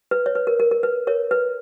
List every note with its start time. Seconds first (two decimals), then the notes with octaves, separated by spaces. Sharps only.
0.11 B4
0.26 C#5
0.35 B4
0.47 A#4
0.60 A#4
0.71 A#4
0.83 B4
1.07 A#4 C#5
1.31 B4